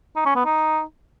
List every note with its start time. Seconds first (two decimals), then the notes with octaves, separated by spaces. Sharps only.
0.16 D#4
0.26 C#4
0.35 B3
0.45 D#4